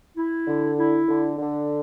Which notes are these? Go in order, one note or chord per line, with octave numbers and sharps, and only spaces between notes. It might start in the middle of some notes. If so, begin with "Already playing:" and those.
E4
D3
E4
D3
D3